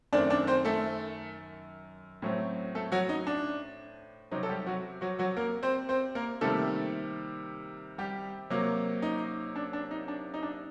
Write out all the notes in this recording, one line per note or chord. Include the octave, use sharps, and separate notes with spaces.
F#2 D#3 A3 C4 D4 D5
D4 D5
C4 C5
A3 A4
A2 F#3 A3 C4
A3 A4
F#3 F#4
D#4
D4
C3 F#3 C4 D#4
A4
G3 G4
F#3 F#4
F#3 F#4
F#3 F#4
A#3 A#4
C4 C5
C4 C5
A#3 A#4
C3 D#3 G3 A3 A#3 A4
G3 G4
C3 F#3 A#3
D#4
D4
D4
D#4
D4
D#4
D4